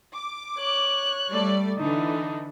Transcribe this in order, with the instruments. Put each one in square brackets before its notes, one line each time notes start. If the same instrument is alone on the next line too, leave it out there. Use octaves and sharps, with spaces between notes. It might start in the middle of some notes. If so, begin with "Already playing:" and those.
[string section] D6
[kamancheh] C#5 F#6
[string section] G3 A3 D5
[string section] D3 E3 [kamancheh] D4 D#4